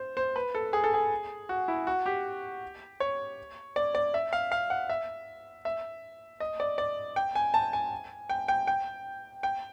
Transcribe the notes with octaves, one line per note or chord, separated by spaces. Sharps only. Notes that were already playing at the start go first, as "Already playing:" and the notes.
Already playing: C5
C5
B4
A4
G#4
A4
G#4
F#4
E4
F#4
G4
C#5
D5
D5
E5
F5
F5
F#5
E5
E5
D#5
D5
D5
G5
G#5
A5
G#5
G5
G5
G5
G5